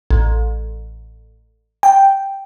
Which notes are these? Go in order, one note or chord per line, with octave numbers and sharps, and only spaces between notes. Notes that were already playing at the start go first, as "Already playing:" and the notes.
A1
G5